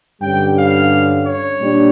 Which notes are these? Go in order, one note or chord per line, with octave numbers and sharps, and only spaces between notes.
G2 D3 G3 C#4 G5
F5
C#5
A#2 G3 D4